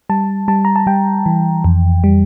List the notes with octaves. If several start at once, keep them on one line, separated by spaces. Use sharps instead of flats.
G3 A5
G3 A5
A#5
A5
G3 G5
E3
F2
G3